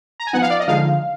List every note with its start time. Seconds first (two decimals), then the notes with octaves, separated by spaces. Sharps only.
0.20 A#5
0.27 G#5
0.33 F3 B3 D#4 F#5
0.42 F5
0.50 D5
0.60 D#5
0.67 D3 F3 G#3 D#4 F5